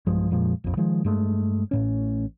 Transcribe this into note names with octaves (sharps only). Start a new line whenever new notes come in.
B1 G2 F3 G#3
F2 A#2 F3 G#3
A#1 F2
D#3 F3 G#3
G2 G#3 A3
A1 A2 C#4